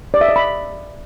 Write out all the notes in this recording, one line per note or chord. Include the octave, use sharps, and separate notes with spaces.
D5
E5
D#5
B5